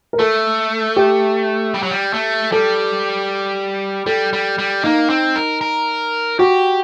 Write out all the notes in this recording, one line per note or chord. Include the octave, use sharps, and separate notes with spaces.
A#4
A3 A4
G4
G3
F#3
G3
A3
G3 A4
G3 A4
G3
G3
A#3 D#4
C4
A#4
A#4
F#4 G4